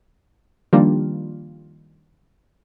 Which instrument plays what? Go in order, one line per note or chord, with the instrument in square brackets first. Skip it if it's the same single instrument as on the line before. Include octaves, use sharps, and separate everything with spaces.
[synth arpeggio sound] D#3 F3 G3 A#3 D4 F4